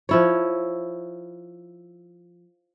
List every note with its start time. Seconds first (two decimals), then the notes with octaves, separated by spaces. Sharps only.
0.09 F3 E4 C#5